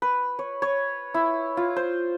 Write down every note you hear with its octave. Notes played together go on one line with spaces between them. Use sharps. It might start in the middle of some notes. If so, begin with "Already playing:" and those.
B4
C#5
C#5
E4
F4
C5